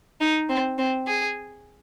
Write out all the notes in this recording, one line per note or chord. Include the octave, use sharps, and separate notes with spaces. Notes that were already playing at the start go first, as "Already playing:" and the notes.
D#4
C4
C4
G#4